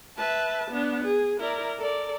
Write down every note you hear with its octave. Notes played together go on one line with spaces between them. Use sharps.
B4 E5 A5
B3 D4
G#4
E4 A#4 D5
A4 A#4 D5